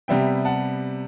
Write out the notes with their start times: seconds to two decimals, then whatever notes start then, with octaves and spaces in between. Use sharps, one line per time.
0.08 C3 G3 B3 E5 G5
0.45 F#5 A5